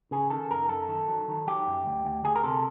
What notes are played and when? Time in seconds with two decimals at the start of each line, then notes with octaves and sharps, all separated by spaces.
0.11 C#3 G#4
0.30 D#3 A4
0.50 F#2 A#4
0.69 F#2 A4
0.88 D#3
1.08 F#3
1.28 D#3
1.47 F#3 G4
1.67 F#2
1.86 D2
2.05 D2
2.24 D2 G#4
2.36 A#4
2.44 C3 A4